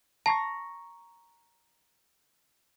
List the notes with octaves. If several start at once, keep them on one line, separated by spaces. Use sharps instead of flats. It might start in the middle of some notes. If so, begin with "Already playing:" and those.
A5 A#5 C#6 A#6 C7